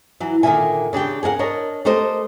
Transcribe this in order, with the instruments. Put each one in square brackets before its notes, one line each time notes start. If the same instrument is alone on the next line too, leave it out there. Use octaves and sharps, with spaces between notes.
[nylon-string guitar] E3 F#3
A#2 D3 D#3 A#3 E5 G#5
C#3 D4 G4 G5
G#4 A#4 F5 F#5
D4 A#4 C#5 D#5
A3 G4 A4 A#4 C5 D#5